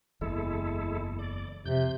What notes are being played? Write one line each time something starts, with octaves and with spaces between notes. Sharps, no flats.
F#1 E2 G#3 E4 A4
D5
F2 C3 G6